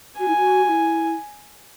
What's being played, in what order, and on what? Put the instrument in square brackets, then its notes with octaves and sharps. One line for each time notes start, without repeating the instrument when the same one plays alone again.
[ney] F#4 [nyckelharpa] G#5
[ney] E4
F#4
F#4
E4